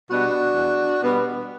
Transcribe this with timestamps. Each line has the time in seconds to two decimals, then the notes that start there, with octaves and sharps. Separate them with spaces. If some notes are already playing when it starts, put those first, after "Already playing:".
0.10 B2 G3 B3 D4 F#4
0.56 E2
1.02 B2 G3 B3